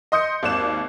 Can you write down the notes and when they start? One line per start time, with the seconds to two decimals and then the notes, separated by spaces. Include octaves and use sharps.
0.12 D#5 C6 D#6 G6 C#7
0.43 G#1 D#2 D5 F#6 E7